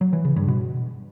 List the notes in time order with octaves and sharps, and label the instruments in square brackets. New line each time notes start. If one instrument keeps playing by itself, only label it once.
[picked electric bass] F#3
E3
C#3
G2
B2